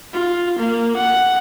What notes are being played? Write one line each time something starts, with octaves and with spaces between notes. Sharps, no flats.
F4
A#3
F#5